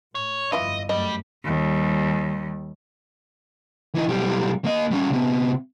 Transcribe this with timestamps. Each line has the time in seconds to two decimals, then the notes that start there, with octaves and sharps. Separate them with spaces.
0.15 A2 C#5
0.52 G1 F2 E3 E4 F4 D#5
0.89 F#2 F#3 G3 A3 D#5
1.45 D#2 G3
3.95 E3 D#4
4.08 B1 G3
4.65 A#3 D#5
4.91 G3 C#4
5.10 C3 B3